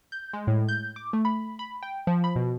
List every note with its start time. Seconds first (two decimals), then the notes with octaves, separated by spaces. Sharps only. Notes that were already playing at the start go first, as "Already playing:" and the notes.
0.12 G6
0.33 G#3
0.47 A2
0.69 G6
0.96 D6
1.13 A3
1.25 B5
1.59 B5
1.83 G5
2.07 F3
2.24 B5
2.36 B2